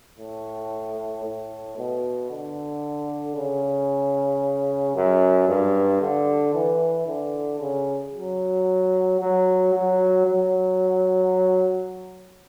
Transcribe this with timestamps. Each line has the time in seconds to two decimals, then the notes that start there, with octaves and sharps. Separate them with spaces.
0.19 A2
1.24 A2
1.78 B2
2.30 D3
3.36 C#3
4.95 F#2
5.48 G2
6.01 D3
6.54 E3
7.07 D3
7.60 C#3
8.14 F#3
9.20 F#3
9.73 F#3
10.26 F#3